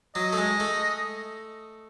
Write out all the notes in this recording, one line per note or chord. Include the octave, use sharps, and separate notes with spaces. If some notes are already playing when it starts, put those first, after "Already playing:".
F#3 D#5
A3
G#3
A3